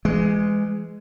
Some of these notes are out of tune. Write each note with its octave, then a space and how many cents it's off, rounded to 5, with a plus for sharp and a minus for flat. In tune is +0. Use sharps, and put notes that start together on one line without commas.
E3 +35 G#3 +0